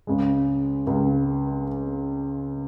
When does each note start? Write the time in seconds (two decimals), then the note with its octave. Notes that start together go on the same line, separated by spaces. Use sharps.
0.07 C#2 C#3 G#3
0.87 C#2 C#3 G#3